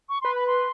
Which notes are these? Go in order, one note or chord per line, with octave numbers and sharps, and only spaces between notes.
C#6
B4 C6
B5
C6